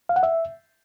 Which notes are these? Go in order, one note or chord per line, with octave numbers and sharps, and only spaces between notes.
F5
F#5
E5